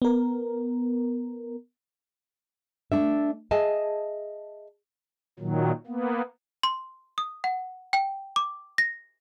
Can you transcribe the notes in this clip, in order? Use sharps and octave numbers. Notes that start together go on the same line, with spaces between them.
B3 A#4
A3 D4 E5
G#4 D#5 E5 G#5 A5
A#2 D#3 F#3
A#3 B3
C6
D#6
F#5
G5
D6
A#6